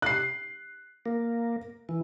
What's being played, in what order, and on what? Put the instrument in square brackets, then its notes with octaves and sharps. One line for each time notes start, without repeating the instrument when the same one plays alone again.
[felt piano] F#6 C7
[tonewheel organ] A#3
E3